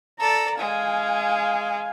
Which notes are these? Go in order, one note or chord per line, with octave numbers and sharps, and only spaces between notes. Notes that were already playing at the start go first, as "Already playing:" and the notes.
A4 D5 A#5
G#3 F5 G#5